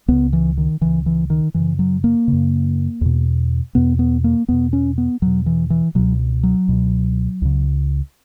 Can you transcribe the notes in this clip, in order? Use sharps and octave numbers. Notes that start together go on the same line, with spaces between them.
C#2 C#3 B3
E3
D#3
C#2 C#3 E3
E3
D#3
F#2 C#3 E3
F#3
A#3
C#3
F#2
E2 B2
E2 B2 B3
B3
A#3
E2 B2 B3
C#4
B3
E2 B2 F#3
E3
E3
C#2 B2 F#3
F#3
C#2 B2
C#2 C#3